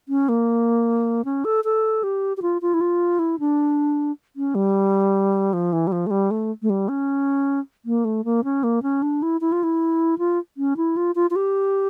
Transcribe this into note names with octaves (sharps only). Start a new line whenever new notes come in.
C#4
A#3
C#4
A4
A4
G4
G4
F4
F4
E4
F4
E4
D4
C#4
G3
F3
E3
G3
F3
A3
G3
A3
A3
G3
C#4
A#3
A3
A#3
C#4
A#3
C#4
D4
E4
E4
F4
E4
F4
C#4
E4
F4
F4
F4
G4